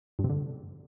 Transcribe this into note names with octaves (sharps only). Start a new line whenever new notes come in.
G2
C3
D3